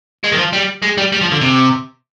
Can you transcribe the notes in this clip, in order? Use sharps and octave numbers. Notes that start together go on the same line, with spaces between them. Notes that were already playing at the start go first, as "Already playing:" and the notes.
G#3
D#3
F3
G3
G#3
G3
G3
F3
D3
C3